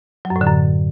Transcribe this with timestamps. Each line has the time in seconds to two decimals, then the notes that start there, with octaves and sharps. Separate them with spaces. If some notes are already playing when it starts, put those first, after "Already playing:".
0.25 F#3
0.30 F#2
0.36 A2
0.41 D3
0.47 F#2